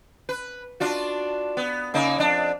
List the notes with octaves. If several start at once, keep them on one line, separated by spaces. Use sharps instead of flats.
B4
D4 F4 F#4
B3
C#3 A#3 D#4
F2 D4